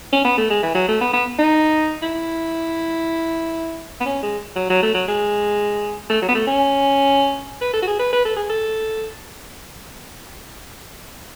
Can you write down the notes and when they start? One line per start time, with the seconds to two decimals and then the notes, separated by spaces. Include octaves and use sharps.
0.13 C#4
0.25 B3
0.37 A3
0.50 G#3
0.63 E3
0.75 F#3
0.88 A3
1.01 B3
1.13 B3
1.39 D#4
2.02 E4
4.01 B3
4.05 C#4
4.23 G#3
4.56 F#3
4.70 F#3
4.82 A3
4.94 F#3
5.08 G#3
6.10 A3
6.22 F#3
6.28 B3
6.35 A3
6.47 C#4
7.61 B4
7.74 A4
7.82 F#4
7.87 G#4
7.99 B4
8.13 B4
8.25 A4
8.37 G#4
8.50 A4